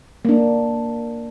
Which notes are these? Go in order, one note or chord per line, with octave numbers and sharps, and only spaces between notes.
A#3 D4